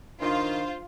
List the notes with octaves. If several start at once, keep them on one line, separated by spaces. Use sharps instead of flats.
D#3 D4 F4 C5